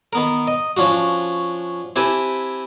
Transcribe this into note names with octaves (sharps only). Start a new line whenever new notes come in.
D#3 B3 A#4
D#5
F3 C#4 D4 F4 F#4
C4 E4 G4 B4 G#5 A5